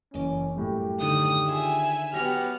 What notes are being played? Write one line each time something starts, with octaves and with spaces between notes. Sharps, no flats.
F#1 E3 C#4 D#5 D6
F#2 A2 G3 G4
D3 D#3 G5 D#6
F4 G#4 E5 G#5
F#3 B3 G4 E5 C#6 F6 A#6